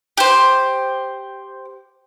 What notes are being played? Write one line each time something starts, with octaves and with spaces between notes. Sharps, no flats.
G4 C5